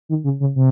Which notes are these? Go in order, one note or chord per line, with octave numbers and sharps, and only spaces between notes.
D#3
C#3
C#3
C3